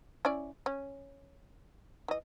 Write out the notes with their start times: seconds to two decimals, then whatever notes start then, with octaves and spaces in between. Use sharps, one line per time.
0.25 C#4 E4 D5
0.66 C#4
2.08 E3 D#5